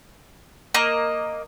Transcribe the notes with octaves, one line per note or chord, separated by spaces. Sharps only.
A#3 D#5